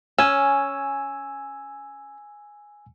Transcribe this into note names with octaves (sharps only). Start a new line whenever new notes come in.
C#4 G#5 E6